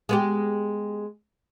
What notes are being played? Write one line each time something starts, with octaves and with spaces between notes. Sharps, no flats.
G#3 B3 G4